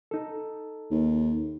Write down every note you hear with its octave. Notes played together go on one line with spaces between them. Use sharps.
D#4 A4
D#2